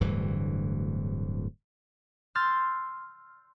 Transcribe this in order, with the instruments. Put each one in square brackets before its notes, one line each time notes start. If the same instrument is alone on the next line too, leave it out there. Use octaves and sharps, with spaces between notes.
[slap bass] D1 D2 G2 E3
[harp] C6 E6 F6 G6 A6